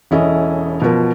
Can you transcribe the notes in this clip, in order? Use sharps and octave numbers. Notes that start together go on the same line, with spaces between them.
E1 C#4 E4 A4 D#5
B2 F3 A#4